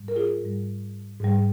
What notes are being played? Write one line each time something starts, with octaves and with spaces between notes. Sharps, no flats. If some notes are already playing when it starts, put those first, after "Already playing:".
Already playing: G#2 G3
A#4
F4 G#4
G#2 G3
G#2 G3